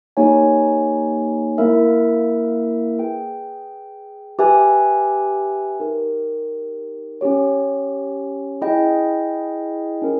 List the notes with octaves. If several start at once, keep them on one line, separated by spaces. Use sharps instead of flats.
A#3 D#4 G4 C#5 G#5
A#3 E4 A#4 E5
G#4 B4 G5
G4 B4 E5 G#5
D#4 G4 A#4
C#4 G4 C#5
E4 G#4 D#5 G5
C#4 E4 A#4